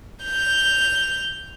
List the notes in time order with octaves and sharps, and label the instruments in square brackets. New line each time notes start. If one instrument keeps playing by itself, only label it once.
[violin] G6 F7